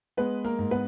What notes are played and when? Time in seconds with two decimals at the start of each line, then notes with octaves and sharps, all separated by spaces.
0.17 G#3 B3 B4
0.44 A#3 A#4
0.59 G#2
0.71 B3 B4